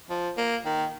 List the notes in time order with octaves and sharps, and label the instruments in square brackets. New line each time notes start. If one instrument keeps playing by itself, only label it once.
[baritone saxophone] F3
A#3
D#3